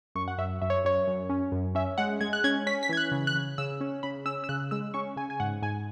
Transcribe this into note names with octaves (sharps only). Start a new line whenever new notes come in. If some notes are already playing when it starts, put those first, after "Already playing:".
F#2 C#6
F#5
F#2 E5
F#2 E5
C#5
F#2 C#5
F#2
C#4
F#2
C#4 E5
G#3 F#5
G#3 G#6
F#6
C#4 G#6
C#4 B6
B6
E3 G#6
F#6
C#3
F#6
C#3
C#3 E6
C#4
C#3 B5
C#4 E6
E6
C#3 F#6
G#3 E6
C#4 C#6
C#3 G#5
G#5
G#2 F#5
G#2 G#5